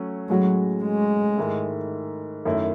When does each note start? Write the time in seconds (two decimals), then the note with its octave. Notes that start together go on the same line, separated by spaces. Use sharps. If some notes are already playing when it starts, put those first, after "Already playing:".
Already playing: F#3 A3 C#4
0.29 A2 F#3 G#3 C#4 F#4
0.84 G#3
1.38 G#2 D#3 A3 E4
2.45 F#2 D#3 A3 E4